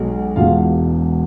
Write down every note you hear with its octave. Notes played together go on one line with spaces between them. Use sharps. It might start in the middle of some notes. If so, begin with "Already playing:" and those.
Already playing: B1 B2 G#3
E1 E2 B2 G#3 F4 F5